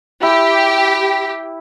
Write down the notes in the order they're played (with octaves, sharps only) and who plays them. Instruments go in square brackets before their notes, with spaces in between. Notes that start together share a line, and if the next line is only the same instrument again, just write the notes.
[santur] E4 [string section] G4